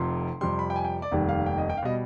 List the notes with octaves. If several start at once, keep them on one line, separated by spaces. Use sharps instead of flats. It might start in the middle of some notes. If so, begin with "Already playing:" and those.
Already playing: F1 F2 C3 F3 C6
F2 C3 G3 C6
B5
G5
G#5
G5
D5
F1 D#2 D#3 G3
F5
G5
D#5
G5
F5
B2 G3 D#5